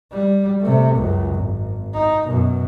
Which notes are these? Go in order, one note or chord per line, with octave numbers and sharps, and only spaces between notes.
G3
C3 A3
C#2 F#2
G#1
D#4
F#2 B2